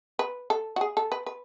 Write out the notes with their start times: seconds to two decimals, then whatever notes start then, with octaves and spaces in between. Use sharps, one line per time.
0.19 B4
0.50 A4
0.76 F#4
0.81 G#4
0.97 A4
1.12 B4
1.26 B4